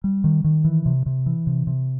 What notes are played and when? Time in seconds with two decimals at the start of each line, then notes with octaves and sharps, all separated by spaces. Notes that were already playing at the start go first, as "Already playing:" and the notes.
0.04 G3
0.24 D#3
0.44 D#3
0.64 E3
0.86 C3
1.06 C3
1.26 E3
1.47 C3
1.67 C3